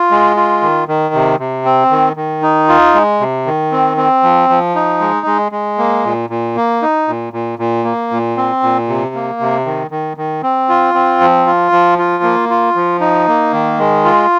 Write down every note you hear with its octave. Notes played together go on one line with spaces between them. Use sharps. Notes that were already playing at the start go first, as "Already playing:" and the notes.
Already playing: F4
G#3
F4
D#3
D#3
C3
C3
C4
D#3
D#3
D#4
F4
G#3
C3
D#3
C4
C4
F3
F3
D#4
G#3
G#3
G#3
A#3
A#2
A#2
A#3
D#4
A#2
A#2
A#2
A#3
A#2
C4
A#2
C3
A#3
C3
D#3
D#3
D#3
C4
F4
C4
F3
F4
F3
F4
A#3
F4
F3
D#4
A#3
D#3
G#3
F4